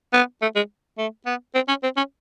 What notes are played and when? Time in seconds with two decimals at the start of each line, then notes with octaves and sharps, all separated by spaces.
0.13 B3
0.42 A3
0.56 G#3
0.98 A3
1.26 B3
1.55 C4
1.68 C#4
1.83 C4
1.97 C#4